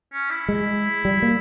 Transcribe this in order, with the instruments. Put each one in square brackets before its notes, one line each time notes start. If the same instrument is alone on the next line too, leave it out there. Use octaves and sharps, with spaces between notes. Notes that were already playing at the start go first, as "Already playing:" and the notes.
[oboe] C#4
E4
[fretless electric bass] G#3
G3
A#3